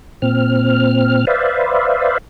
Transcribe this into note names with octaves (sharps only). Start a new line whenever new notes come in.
A#2 C4 F6
B4 C5 D5 E5 F5